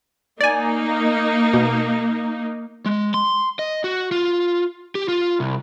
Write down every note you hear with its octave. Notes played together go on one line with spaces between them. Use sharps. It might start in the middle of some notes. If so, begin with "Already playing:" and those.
A#3 D#4 D5 G#5
B2
G#3
C6
D#5
F#4
F4
G4
F4
C2